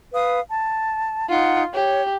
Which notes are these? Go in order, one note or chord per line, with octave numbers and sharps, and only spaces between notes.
B4 F5 D#6
A5
D#4 F4 F#5
G4 C#5